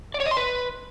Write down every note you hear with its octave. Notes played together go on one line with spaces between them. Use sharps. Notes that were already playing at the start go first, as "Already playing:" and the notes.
D5
C#5
D#5
C6
B4